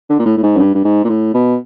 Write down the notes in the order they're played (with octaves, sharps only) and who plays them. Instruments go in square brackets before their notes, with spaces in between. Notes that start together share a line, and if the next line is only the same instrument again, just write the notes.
[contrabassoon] D3
A#2
A2
A2
G#2
F#2
G2
G2
G#2
A#2
A2
B2